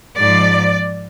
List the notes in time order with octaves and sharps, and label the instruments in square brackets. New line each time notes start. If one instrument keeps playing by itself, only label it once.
[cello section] G#2 F3 D5